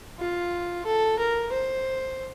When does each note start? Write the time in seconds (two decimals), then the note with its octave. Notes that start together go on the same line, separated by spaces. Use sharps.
0.19 F4
0.85 A4
1.19 A#4
1.52 C5